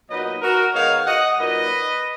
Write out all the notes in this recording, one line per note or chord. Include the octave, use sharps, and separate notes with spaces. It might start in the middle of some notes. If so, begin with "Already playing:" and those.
A#2 F#3 B3 D#4 B4 D#5
F#4 A#4
D#3 G#3 B3 D#4 C#5 F5
D#5 F#5
A#2 F#3 A#3 D#4 B4 D#5